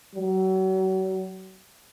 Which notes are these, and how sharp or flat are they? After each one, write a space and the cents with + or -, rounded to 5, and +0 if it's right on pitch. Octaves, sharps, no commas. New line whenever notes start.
F#3 +35